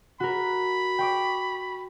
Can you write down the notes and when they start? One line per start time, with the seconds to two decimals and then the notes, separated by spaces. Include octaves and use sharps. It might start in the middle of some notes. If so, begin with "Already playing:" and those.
0.20 F#4 A#4 B5
0.99 G5 C#6 D6